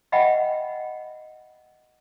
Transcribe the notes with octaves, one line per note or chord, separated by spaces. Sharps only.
D#5 E5 F#5 G5 B5